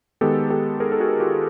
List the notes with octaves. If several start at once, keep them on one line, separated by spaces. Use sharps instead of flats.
D#3 G#3 B3 G4 A4
G4 A4
G#4 A#4
A4
F#4 G#4
F4 G4